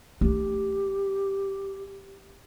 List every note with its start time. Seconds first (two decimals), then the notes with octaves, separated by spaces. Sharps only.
0.21 A3 D4 G4